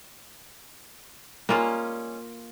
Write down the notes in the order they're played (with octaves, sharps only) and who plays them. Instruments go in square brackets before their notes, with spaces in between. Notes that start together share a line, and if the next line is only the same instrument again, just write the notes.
[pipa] G3 G#3 C#4 [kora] A#3 F4